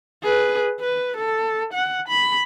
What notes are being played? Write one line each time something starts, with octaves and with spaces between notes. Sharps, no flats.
G#4 B4
B4
A4
F#5
B5